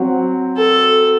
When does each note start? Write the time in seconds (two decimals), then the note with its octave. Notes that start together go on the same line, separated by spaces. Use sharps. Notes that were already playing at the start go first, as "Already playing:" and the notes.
Already playing: F#3 C4 F#4
0.57 A4